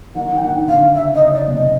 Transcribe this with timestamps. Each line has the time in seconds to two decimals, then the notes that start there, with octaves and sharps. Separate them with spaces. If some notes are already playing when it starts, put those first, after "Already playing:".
0.15 D#3 D#4 F#5
0.36 D4 G5
0.41 D#3 D#4 F#5
0.67 D3 D4 F5
0.94 C#3 C#4 E5
1.14 D#5
1.21 C#3 C#4
1.34 D5
1.47 C3 C4
1.54 D#5